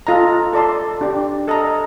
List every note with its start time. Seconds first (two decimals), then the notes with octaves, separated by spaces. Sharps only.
0.07 F4 A4 D#5 A#5
0.53 A4 D5 A5 C6
1.01 D4 G4 D5
1.48 A4 D#5 A#5